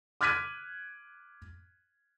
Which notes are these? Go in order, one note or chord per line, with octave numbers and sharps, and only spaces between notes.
D6 F6 F#6 G#6 B6 D#7